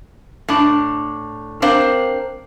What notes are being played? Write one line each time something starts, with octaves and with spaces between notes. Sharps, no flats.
A2 D4
C4 D4 A#4 C5 F5